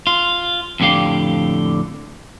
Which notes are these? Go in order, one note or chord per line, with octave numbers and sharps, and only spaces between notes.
F4
F2 A2 D3 G4 F5